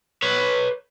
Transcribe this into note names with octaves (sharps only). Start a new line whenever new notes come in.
B4 C#5